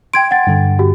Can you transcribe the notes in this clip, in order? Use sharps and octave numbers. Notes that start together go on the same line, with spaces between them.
G5 C6 G#6 D7
F#5 A6
G2 D3
F#4 G4